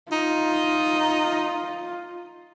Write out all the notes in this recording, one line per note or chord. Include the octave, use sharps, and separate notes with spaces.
D#4 F4